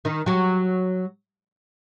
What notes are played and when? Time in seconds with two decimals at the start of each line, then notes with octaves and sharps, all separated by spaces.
0.05 D#3 D#4
0.26 F#3 F#4